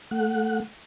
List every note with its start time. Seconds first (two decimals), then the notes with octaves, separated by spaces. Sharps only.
0.11 A3 F#5